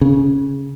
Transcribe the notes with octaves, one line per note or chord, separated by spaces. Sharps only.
C#3